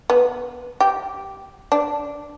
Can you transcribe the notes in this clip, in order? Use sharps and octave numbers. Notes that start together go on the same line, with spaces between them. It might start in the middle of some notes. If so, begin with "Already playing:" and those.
B3
G4
D4